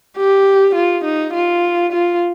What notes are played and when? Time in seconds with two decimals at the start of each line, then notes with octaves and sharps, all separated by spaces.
0.17 G4
0.75 F4
1.04 D#4
1.33 F4
1.92 F4